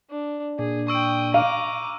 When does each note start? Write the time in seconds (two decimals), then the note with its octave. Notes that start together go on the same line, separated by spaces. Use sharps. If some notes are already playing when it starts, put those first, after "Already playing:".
0.10 D4
0.59 A#2 D4 G#4
0.88 G5 C#6 D#6 E6 D7
1.34 F5 A#5 D6 D#7